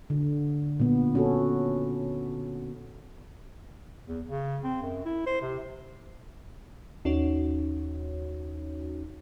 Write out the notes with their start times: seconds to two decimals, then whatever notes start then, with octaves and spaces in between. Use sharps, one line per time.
0.10 D3
0.80 A#2 B3
1.15 C#4 F#4 A4
4.08 E2
4.27 C#3
4.64 C4
4.82 F#2
5.05 E4
5.26 C5
5.41 C3
7.05 D#2 C#4 D#4 F#4 C#5